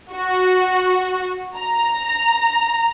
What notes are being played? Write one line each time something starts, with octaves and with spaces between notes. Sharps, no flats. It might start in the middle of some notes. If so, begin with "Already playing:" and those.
F#4
A#5